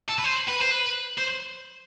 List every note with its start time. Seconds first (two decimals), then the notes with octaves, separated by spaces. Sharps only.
0.09 A4
0.19 B4
0.24 C5
0.48 B4
0.61 C5
0.71 B4
1.18 C5